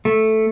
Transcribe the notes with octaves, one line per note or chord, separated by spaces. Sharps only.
A3